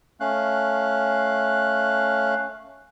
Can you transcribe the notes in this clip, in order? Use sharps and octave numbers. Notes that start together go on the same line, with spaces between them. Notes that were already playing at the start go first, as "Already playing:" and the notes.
A3 C#4 F5 F#6